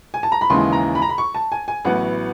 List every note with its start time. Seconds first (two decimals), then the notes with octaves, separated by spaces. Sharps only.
0.14 G#5
0.23 A5
0.32 A#5
0.41 B5
0.50 D#2 C#3 E3 G#3 C6
0.73 A#5
0.95 B5
1.02 A#5
1.09 B5
1.18 C#6
1.35 A5
1.52 G#5
1.68 G#5
1.85 A1 A2 F#3 B3 F#5